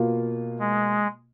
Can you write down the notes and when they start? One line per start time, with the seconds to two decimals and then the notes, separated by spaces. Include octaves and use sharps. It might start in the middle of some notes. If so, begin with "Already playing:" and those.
Already playing: B2 A#3 F4
0.59 G#3